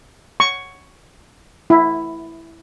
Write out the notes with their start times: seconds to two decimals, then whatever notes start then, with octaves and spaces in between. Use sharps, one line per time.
0.40 C#6
1.70 E4